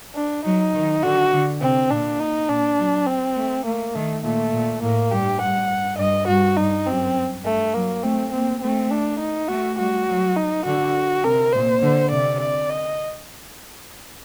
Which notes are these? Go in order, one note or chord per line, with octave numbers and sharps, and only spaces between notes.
D4
F#3 D#4
D#3
D3 F#4
D3
C3 C4
A#2 D4
D#4
A#2 D4
F#3
C4
A3
A3 A#3
D#3 A3
A#2 A3
A#2
A2 A#3
G2 G4
G2 F#5
G2 D#5
G2 F#4
G2 D#4
F#2 C4
G2 A3
F#3 A#3
A3 C4
A#3 C4
A3 C4
D4
D#4
A3 F#4
G3 F#4
F#3
D#4
D3 F#4
C3 A#4
A#2 C5
D3
C3 D5
D5
D#5